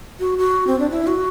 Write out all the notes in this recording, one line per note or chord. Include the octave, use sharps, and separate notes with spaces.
F#4
F#4
C4
D4
E4
F#4